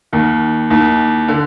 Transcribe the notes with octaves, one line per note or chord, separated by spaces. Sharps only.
D#2 D#3
D#2 D#3
D3